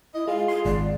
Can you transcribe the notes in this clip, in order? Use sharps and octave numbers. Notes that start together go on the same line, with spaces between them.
E4 D#5
G#3 F4 F5
G#4 C6
G#1 D5